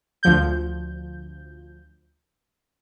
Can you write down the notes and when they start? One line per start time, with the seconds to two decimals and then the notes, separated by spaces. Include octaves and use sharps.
0.23 D2 F3 G6